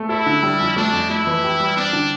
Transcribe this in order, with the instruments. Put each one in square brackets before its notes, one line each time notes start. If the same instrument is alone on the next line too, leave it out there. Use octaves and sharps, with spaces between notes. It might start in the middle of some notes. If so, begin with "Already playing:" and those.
Already playing: [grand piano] A3
[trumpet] E4 [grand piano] A4
[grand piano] D3
G3
F2
[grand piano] A3 [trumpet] D4
[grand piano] F2
[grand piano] A3 [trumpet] E4
[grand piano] E3
G4
G3
[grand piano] C4 [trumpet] D4
[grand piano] D3